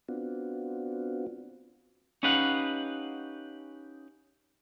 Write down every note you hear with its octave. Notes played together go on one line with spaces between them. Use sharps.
B3 C4 D4 F4 F#4
C#4 D#4 G4 B4 F5 F#5